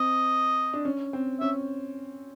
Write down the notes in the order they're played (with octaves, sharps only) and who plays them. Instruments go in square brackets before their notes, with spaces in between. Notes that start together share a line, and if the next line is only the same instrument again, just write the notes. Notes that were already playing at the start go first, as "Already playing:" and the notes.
Already playing: [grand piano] C4 [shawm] D#5
[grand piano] D4
C#4
C4
[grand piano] C#4 [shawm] E5